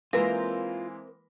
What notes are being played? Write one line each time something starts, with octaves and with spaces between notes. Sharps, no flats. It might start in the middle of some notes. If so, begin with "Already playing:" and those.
E3 G#3 A#3 C4 F4 A#4 B4 E5